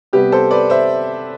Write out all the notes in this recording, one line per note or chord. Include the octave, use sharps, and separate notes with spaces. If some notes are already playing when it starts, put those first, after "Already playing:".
C3 G3 B3 G4 B4
A4 C5
B4 D5
C5 E5